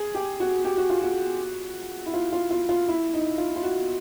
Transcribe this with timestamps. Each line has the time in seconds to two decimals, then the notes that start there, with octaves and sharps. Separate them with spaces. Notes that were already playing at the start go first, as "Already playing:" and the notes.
Already playing: G#4
0.14 G4
0.40 F#4
0.65 G4
0.77 F#4
0.90 F4
1.02 F#4
2.06 E4
2.14 F4
2.32 F4
2.51 F4
2.69 F4
2.88 E4
3.14 D#4
3.38 F4
3.56 F4
3.63 F#4